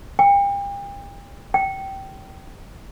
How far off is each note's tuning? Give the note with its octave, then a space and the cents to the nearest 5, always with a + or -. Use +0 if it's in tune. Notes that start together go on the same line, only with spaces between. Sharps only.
G5 +40
G5 -20